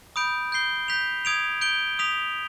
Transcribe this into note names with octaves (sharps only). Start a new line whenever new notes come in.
B5 D#6 G6 D7
G6 C7 G7
G6 B6 F7
D#6 G#6 D7 F7
G6 D7 G7
D#6 B6 F7